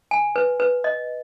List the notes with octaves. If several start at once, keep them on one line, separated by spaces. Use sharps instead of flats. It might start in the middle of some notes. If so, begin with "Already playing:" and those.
G#5
B4
B4
D#5